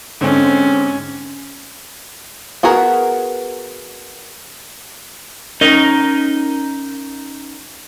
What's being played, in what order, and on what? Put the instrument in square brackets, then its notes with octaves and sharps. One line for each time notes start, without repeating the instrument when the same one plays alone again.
[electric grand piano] G#2 D3 C4 [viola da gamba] C#4
[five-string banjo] B3 F#4 G#4 A#4 B4
[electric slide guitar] C#4 D#4 A#4 D#5